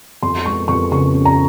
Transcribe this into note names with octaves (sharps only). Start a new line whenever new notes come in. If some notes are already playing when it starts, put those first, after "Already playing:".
F2 C6
G#3 C#6
F2 C#6
C#3 C#6
C#4
A#5